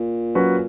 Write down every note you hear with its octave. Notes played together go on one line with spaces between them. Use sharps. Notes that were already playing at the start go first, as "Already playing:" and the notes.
Already playing: A#2
F#3 C#4 F#4 B4